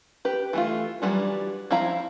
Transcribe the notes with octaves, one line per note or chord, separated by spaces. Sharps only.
G4 B4
E3 A3 F4
E3 F#3 G3 D4
F3 C4 E4 F5 A#5